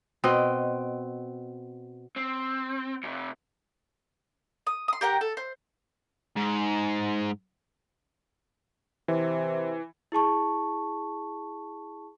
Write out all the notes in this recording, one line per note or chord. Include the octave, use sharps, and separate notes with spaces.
B2 C4 D#5
C4
F2 C3
D#6
C6 D#6
G4 A#4 F#5 G5
A4
C5
G#2
C3 E3
E4 G#4 A5 C#6